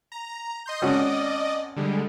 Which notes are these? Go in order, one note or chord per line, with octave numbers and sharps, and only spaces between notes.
A#5
D#5 C6 G6
G#1 C#4 F#4 D5 D#5
D3 G3 G#3